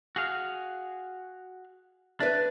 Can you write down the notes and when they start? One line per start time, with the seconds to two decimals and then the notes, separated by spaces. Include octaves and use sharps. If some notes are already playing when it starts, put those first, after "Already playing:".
0.16 F#4 G#4 F5
2.20 D4 B4 D5 E5